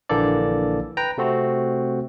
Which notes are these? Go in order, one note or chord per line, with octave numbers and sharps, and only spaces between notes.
A#1 D3 E3 A#3 A4 D5
B4 G5 A#5
C3 A3 C4 F#4